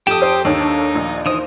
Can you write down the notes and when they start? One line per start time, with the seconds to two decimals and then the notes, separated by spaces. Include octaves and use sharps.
0.07 F2 G4 A4 G5 D#6 E7
0.22 C5
0.45 D#2 D4 D#4 A4 C#5
0.95 A#1
1.26 E3 D#4 C5 D#6